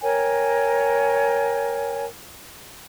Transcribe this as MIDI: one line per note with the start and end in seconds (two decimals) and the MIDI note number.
0.02 2.05 70
0.02 2.05 73
0.02 2.05 79
0.02 2.05 80